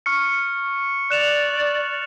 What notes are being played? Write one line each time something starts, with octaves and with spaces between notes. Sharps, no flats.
C#6 F6 C#7
D5 F#6 E7 F7